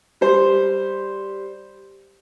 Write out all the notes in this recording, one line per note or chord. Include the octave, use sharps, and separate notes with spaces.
G3 C5